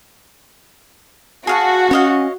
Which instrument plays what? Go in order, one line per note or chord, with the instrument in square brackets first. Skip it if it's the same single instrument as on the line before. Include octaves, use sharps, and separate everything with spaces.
[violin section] F#4 [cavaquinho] G#4 F5 A5
[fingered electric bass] C#4 [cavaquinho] C#5 D#5 F5